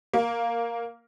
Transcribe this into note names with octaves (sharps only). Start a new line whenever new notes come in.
A#3